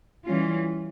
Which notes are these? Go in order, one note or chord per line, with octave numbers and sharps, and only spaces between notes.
E3 G3 C#4 F4